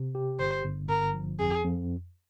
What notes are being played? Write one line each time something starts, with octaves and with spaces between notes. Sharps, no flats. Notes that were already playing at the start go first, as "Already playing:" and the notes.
Already playing: C3
G4
G1 C5
G1
G1 A#4
F3
F2 G#4
F2